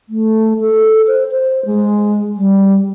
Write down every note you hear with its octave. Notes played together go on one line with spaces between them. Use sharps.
A3
A4
C5
C5
G#3
G3